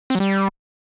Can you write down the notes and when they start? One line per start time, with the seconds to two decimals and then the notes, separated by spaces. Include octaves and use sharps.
0.10 C4
0.15 F#3
0.20 G3